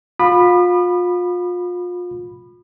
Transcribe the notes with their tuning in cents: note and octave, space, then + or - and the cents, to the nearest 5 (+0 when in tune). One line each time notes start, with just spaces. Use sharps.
F4 +30 B5 +0 D#6 -45